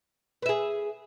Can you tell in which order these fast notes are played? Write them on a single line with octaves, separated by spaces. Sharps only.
B4 E5 G#4